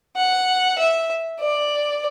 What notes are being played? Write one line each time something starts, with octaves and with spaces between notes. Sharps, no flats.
F#5
E5
D5